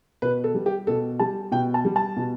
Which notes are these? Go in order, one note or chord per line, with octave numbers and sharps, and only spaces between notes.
B2 B4
A4
G3
G4
B2 A4
G3 A5
B2 G5
A5
G3
A5
B2